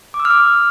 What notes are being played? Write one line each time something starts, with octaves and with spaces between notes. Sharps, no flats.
D6
E6
F6
D6